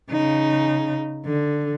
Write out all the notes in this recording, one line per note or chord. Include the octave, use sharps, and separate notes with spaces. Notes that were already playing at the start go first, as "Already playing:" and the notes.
C#3 D#4
D3